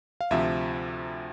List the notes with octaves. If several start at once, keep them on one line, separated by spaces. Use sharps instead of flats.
F5
D2 C3 F3 E5